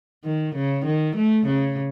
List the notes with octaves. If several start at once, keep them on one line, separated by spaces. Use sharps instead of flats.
D#3
C#3
D#3
A3
C#3